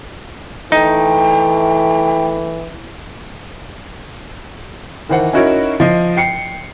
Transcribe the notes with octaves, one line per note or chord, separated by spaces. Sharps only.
E3 A3 D#4 G5
D#3 E3 C5 F#5
C#4 D#4 E4 F#4 A#4 C#5
F3 D#5 C7
G5 C7 C#7